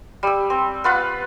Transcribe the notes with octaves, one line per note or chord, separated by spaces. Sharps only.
G3 E6
C4
B3 F4 B4 F#5